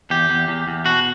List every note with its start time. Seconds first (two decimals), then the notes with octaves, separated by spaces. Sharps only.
0.10 E2 G4
0.29 E2
0.48 E2
0.68 E2
0.86 B2 F#4